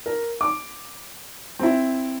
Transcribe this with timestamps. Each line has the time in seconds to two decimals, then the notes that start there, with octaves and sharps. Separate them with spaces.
0.06 A#4
0.41 D6
1.59 C4 E4